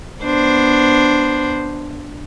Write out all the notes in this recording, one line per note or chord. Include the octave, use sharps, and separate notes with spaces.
B3 D4 C5